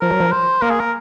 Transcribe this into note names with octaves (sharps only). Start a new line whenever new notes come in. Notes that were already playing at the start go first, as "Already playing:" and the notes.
F3 A#4
F#3
F3
C5
A#3 A#4
G#4
A#4